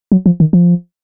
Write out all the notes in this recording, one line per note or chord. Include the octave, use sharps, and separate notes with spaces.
F#3
F3
D#3
F3